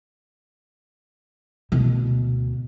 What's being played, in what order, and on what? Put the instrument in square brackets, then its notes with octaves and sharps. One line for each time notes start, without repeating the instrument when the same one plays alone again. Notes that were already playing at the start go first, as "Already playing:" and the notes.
[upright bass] D2 B2